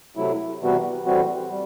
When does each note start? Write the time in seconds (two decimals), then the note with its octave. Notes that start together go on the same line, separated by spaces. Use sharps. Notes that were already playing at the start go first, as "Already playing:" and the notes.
0.16 C3 F#3 A3 E4
0.61 C3 E3 G3 B3 F#4
1.06 A2 E3 G3 C4 F#4
1.50 G3